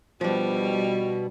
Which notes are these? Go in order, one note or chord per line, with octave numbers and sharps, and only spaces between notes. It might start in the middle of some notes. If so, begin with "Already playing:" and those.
B2 F3 G3 D4